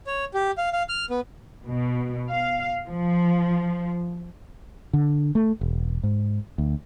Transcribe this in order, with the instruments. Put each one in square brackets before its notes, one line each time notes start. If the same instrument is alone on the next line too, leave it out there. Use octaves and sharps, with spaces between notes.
[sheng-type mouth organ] C#5
G4
F5
F5
F6
B3
[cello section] B2
F5
F3
[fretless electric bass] D3
A3
E1
G#2
D2